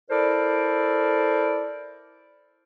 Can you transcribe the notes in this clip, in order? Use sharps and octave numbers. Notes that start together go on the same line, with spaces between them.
E4 A4 A#4 C5 D5